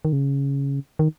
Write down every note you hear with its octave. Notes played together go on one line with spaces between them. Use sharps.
D#3
C#3
D#3